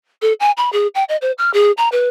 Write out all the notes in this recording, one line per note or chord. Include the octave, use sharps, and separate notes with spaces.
A4
G#5
B5
G#4
G5
D#5
C5
F6
G#4
A#5
B4